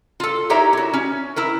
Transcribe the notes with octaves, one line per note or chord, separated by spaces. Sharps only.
F4 A4
D#4 E4 G4 A#4 C#5 E5
E4 F#4
C#4
E4 A#4 B4